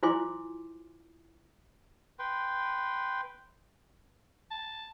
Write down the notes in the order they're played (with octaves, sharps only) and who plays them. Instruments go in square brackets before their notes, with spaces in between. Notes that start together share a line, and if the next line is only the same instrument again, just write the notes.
[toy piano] E4 F4 C5 G#5 C6 D6
[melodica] B4 G5 C6
[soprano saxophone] A5